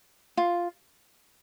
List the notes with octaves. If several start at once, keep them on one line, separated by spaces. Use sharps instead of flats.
F4